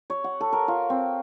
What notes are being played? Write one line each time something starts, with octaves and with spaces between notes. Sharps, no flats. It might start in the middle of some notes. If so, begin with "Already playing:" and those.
C#5
F#5
A4
A#4
F4
C4